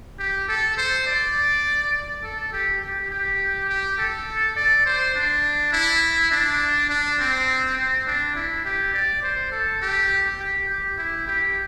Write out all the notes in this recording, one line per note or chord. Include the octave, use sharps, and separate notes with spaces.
G4
A4
C5
D5
A4
G4
G4
G4
G4
A4
D5
C5
D4
E4
D4
D4
C4
C4
D4
E4
G4
D5
C5
A4
G4
G4
G4
E4
G4